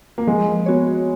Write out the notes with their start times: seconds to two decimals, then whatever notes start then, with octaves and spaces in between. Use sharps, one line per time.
0.18 A#3
0.27 F3 G#3
0.66 B3 F#4 C#5